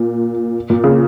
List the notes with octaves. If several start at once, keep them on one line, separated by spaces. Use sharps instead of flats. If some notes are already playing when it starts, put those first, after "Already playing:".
Already playing: A#2
A#2
C#3